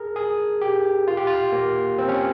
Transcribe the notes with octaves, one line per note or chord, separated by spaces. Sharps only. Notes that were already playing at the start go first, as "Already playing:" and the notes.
Already playing: G#4 A#4
G#4
G4
F4
G4
F4
A#3
C4
C#4